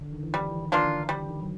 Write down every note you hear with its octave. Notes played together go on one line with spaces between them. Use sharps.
D3
D#3
E3
F3 G3
E3
D#3
A#3 D4 F4
D3
D3 G3
D#3
F#3